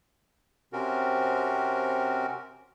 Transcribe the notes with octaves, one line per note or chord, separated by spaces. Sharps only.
C3 C4 C#4 F#4 A#4